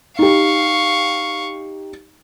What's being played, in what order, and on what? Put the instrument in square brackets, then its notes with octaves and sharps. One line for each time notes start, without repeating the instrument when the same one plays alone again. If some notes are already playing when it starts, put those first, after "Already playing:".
[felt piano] D#4 G4 [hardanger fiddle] F5 C#6